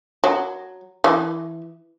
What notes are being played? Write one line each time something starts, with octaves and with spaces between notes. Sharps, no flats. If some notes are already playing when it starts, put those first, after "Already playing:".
F#3
E3